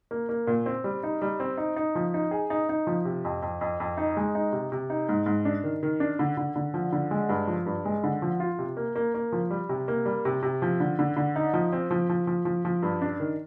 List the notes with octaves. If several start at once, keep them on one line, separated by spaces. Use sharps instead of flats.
A#3
A#3
A#2
C4
G3
D#4
G3
C4
D#4
D#4
F3
D#4
G#4
D#4
D#4
F3
C3
F2
F2
F2
F2
D#4
G#3
D#4
C3
C3
D#4
G#2
G#2
D4
D#3
D#3
D4
D3
D3
D3
F3
D3
G#3
G2
F3
G2
G#3
D3
F3
F4
C3
A#3
A#3
A#3
F3
G3
C3
A#3
G3
C3
C3
F3
D3
D3
D3
D#4
F3
C4
F3
F3
F3
F3
F3
G2
D4
D#3